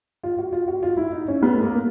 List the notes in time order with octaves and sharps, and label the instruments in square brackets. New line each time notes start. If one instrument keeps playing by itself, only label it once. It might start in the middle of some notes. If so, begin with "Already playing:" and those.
[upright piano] F4
F#4
F4
F#4
F4
E4
D#4
C#4
B3
A3
A#3